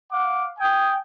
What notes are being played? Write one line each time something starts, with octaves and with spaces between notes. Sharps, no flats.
F5 F#5 D6
G5 G#5 D#6